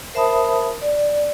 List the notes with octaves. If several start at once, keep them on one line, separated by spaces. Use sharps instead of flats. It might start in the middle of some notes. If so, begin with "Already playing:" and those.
A#4 C5 E5 A5 B5 D#6
D5